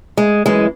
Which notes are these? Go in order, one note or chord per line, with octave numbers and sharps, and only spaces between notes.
G#3
F#2 E3 G#3